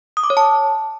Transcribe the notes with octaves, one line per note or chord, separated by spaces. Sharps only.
D#6
D6
C#5
A5